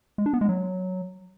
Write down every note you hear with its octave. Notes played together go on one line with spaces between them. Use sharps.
G#3
D4
B3
G#3
F#3